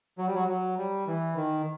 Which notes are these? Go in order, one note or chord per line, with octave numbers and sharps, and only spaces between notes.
F#3
G3
F#3
F#3
G3
E3
D#3